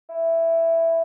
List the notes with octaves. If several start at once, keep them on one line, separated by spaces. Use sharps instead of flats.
E4